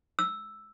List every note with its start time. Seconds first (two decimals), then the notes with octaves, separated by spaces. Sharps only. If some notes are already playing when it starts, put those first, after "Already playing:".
0.19 E6